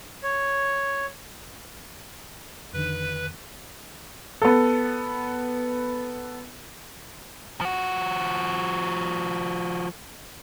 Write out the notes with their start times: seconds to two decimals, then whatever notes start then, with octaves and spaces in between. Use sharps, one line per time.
0.23 C#5
2.73 F2 D3 D#3 B4
4.42 B3 A4
7.61 F3 F#4